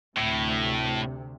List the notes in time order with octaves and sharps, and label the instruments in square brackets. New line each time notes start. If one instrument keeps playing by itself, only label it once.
[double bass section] D2 C3 [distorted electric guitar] A2